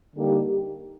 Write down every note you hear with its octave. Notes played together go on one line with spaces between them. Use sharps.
D3 G3 A#3 D#4 G4